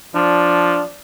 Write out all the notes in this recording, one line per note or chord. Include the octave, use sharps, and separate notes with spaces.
F3 D4